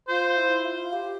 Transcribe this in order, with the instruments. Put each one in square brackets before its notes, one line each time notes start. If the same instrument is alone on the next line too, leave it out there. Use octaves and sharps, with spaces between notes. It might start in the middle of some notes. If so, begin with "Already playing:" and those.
[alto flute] F4 [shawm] C5
[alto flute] E4
F4
G4